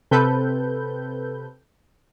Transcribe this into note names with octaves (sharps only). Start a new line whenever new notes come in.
C3 C4 A4 B4 G6